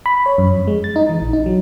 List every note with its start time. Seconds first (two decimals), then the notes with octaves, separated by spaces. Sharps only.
0.06 B5
0.26 C#5
0.38 F#2
0.54 F2
0.67 G#3
0.84 A6
0.96 D#4
1.09 E3
1.21 A#1
1.33 D#4
1.46 F#3